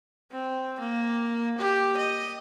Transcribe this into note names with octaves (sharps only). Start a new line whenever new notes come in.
C4
A#3
G4
D#5